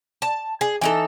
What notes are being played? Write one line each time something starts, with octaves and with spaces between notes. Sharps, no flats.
A5
G#4
E3 D#4 A4